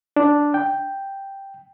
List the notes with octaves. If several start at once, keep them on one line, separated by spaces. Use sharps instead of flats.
D4
G5